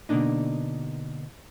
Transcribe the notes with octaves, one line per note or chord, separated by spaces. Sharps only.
B2 D3 A#3 D4 D#4